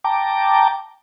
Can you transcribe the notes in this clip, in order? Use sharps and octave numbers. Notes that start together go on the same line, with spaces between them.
G5 A5 A#5 D6